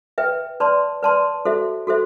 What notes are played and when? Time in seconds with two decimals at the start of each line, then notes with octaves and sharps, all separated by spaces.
0.18 B4 E5 G5
0.60 B4 D5 A5 C6
1.03 B4 D5 A5 C6
1.45 F#4 A4 C5 E5
1.87 F#4 A4 C5 E5